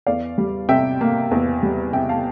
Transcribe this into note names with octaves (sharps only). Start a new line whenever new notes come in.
E2 D5 F5
G3
C3 E5 G5
A#3
E2
G3
C3 E5 G5
F5 A5